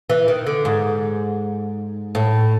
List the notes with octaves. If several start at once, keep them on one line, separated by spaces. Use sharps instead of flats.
E3
D#3
D3
G#2
A2